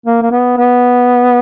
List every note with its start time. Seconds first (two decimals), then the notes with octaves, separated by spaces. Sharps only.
0.06 A#3
0.22 A#3
0.31 B3
0.58 B3